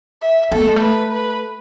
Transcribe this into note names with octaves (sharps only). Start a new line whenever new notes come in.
E5
B3 A4
A3
G#3
A3
B4
B4